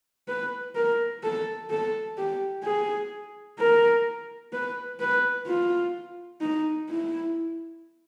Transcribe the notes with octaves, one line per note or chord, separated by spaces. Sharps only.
B4
A#4
A4
A4
G4
G#4
A#4
B4
B4
F4
D#4
E4